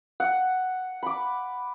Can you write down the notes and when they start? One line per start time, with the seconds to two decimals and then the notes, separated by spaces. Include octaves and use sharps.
0.20 F#5
1.03 B5 D6